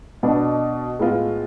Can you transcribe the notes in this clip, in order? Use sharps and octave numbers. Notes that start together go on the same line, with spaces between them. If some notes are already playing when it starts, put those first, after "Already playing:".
B2 B3 D4
A2 G#3 B3 F4